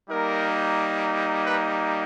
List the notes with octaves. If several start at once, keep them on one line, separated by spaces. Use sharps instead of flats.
G3 A#3 D#4 A#4
B4